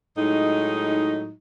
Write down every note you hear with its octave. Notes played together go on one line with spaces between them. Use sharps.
A2 F#3 G#3 D#4